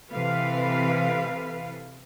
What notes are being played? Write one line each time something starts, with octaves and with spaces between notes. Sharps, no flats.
C3 E3 A4 B4 F5